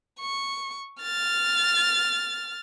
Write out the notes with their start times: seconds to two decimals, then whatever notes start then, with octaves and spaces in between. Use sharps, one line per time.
0.20 C#6
1.02 F6 A6